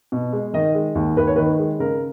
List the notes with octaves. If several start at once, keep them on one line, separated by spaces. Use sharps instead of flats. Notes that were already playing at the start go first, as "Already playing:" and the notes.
B2
G#3
D#3 D#5
G#3
D#2
D#2 B4
C#5
D#3 B4
G#3
C#3 A#4